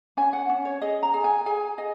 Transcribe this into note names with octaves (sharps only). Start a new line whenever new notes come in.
C#4 G#5
F#5
C#4
C#5
G#4 D#5
A#5
G#4
G#5
G#4 G#5
G#4 D#5